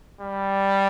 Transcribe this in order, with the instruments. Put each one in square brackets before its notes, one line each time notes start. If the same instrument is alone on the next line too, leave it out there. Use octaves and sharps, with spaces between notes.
[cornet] G3